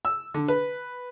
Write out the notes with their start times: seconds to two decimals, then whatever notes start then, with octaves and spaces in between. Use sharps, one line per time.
0.05 E6
0.34 D3
0.48 B4